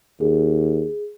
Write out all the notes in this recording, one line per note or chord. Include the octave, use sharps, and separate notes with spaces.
D#2 G#4